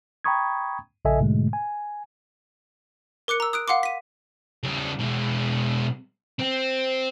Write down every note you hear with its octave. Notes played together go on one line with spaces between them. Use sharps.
G5 A#5 B5 C#6 D#6 G#6
A#1 C#3 A4 D#5 E5 G#5
G#2 B2 D3 G#3 A3
G#5
A#4 D6 F#6 C#7
A#5 E6
D#6 F#6 D7
F5 F#5 C6 D6
B6 D#7
C#3 G3
B2 G#3
C4